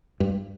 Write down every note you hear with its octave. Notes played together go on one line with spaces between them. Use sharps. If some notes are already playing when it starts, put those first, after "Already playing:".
G2